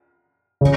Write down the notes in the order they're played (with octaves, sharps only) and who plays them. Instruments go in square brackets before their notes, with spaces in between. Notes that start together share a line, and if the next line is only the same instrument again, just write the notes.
[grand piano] C#3